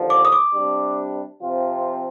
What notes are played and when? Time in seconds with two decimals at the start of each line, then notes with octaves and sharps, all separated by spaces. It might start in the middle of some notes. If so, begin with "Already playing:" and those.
Already playing: D#2 D3 F3
0.10 D6
0.25 D#6
0.32 D6
0.54 C3 G3 D4
1.41 C3 F3 C4 F4